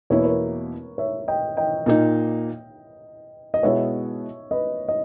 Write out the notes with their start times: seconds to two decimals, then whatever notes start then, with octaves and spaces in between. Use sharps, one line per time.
0.10 E2 B2 A#3 E4 C#5
0.18 B4
0.24 A#4 C#5
0.98 C#5 E5
1.28 D#5 G5
1.57 D#5 G5
1.86 A#2 A#3 D#4
3.54 D#5
3.63 B2 G#3 B3 E4 C#5 E5
4.51 B4 D#5
4.88 D#5